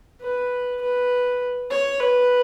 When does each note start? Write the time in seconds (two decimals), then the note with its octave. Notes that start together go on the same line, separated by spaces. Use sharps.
0.21 B4
0.81 B4
1.71 C#5
2.00 B4